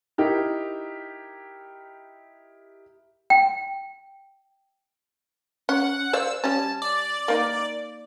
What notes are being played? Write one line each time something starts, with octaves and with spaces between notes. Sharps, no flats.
D#4 E4 G4 A#4
G5
C#4 F#5
C5 D5 F5 E6
G3 C#4 A5
D5
A#3 D#4